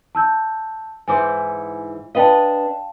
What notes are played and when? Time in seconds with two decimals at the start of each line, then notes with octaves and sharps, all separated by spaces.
0.15 A5 E6 G6
1.08 G#2 E3 C5 G#5 D6
2.15 D4 B4 D#5 F5 G5 A5